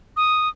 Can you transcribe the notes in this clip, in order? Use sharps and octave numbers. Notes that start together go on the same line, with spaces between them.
D#6